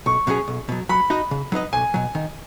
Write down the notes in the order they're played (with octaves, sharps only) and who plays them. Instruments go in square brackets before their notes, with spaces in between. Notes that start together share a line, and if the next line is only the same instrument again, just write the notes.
[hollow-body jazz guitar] B1 [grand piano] C#6
[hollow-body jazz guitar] B2 F#3 C#4 G#4
B1
B2 F#3
[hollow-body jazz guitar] F#3 [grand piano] B5
[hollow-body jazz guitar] D#4 F#4 D#5
C#3
F#3 D#4 B4 D#5
[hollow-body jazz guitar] B1 [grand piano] G#5
[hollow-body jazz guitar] B2 F#3
D#3